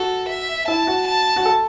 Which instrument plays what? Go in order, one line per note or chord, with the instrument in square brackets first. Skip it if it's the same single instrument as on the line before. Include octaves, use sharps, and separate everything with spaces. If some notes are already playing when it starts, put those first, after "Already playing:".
Already playing: [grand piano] F#4 [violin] A4
[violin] E5
[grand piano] E4 [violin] A5
[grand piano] F#4
[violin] A5
[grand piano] F#4
A4